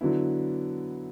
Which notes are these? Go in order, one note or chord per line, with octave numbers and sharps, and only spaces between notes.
D3 F#3 B3 E4